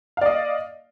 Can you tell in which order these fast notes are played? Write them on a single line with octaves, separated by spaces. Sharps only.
F5 D5 D#5